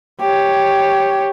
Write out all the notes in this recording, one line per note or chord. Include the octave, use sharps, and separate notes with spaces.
G4 C#5